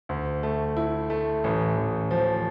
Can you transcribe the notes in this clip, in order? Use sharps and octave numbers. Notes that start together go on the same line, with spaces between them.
D2
A3
E4
A3
A1
A1
F3